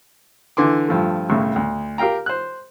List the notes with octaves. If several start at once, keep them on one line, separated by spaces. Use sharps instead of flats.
D3 E3 C6 D6
G2 F3 A3
C2 A2 C#3
D2
G4 A#4 F5 G5 A#5
C5 F#6